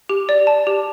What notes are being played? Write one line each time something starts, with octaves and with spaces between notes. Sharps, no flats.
G4
D5
A5
G4